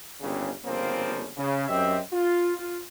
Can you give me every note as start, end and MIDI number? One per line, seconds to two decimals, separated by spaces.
0.21 0.49 31
0.21 0.49 39
0.21 0.49 49
0.65 1.27 31
0.65 1.27 49
0.65 1.27 53
0.65 1.27 58
0.65 1.27 60
1.37 1.66 49
1.68 1.97 42
1.68 1.97 60
1.68 1.97 67
1.68 1.97 75
1.68 1.97 76
2.12 2.52 65
2.56 2.77 65